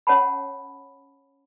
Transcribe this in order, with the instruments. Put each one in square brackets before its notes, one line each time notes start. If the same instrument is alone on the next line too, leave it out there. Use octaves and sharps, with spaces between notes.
[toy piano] C#4 C#5 F#5 A5 B5